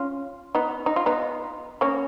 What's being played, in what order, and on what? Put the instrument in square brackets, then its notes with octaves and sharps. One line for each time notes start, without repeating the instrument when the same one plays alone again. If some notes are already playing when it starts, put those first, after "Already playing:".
Already playing: [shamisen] C#4 F4
B3 D#4
D#4
F4
B3 D#4
A#3 C#4